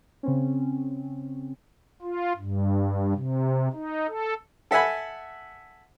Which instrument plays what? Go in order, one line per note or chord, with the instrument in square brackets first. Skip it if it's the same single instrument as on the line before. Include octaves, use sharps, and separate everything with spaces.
[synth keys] C#3 C4 C#4
[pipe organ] F4
G2
C3
D#4
A4
[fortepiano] A4 E5 F#5 G#5 B5